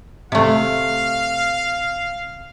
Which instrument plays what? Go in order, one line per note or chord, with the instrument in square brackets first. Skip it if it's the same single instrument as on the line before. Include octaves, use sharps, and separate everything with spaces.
[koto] C3 A3 [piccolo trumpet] F5